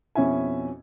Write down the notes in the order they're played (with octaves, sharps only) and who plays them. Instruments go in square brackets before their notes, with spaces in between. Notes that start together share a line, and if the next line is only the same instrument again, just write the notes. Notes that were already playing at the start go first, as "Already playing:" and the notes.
[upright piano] F2 B2 C#4 E4 E5 G#5